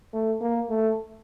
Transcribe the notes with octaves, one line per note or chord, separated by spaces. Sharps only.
A3
A#3
A3